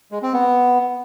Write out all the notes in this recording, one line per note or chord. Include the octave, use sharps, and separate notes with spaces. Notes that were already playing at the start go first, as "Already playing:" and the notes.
G#3
C4
B3